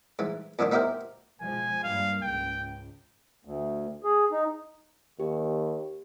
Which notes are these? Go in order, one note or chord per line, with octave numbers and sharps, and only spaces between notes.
G#2 E3
F2 A2 D3 D#3 D4
B3 D#4 E4 G4 A#4 C5
B2 F3 G#3 G#5
G2 G3 A#3 F5
C#2 G#2 G5
D2
G#4
D#4
D#2 G4